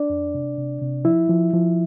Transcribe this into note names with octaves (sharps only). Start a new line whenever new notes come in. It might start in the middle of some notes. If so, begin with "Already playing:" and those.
Already playing: D4 D5
F2
C3
C3
C3
F3 E4 E5
F3
F3